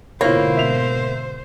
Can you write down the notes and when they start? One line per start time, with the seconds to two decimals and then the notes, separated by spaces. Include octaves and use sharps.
0.21 G#2 B2 D3 A#3 E4 F4 C5 C#5
0.57 E5 F7